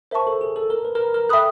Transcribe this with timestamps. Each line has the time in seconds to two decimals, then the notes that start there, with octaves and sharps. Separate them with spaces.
0.11 A#4 C5 E5 A5 C#6
0.27 A4
0.41 G#4
0.56 A4
0.70 A#4
0.85 B4
0.95 A#4
1.00 B4
1.14 A#4
1.29 A4 E5 G5 B5 D#6 F#6